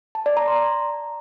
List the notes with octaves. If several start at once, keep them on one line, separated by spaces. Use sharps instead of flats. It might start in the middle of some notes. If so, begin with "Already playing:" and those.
A5
D5
A#5
C6